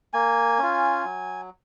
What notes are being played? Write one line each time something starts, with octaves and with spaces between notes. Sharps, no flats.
A#3 G#5
C#4 F4
F#3